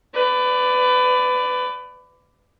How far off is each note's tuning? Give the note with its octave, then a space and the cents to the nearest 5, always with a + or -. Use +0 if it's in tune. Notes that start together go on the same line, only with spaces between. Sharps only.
B4 +25 D5 +0